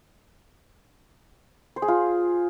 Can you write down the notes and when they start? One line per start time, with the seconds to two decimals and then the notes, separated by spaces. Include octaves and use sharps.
1.76 C5
1.82 G#4
1.88 F4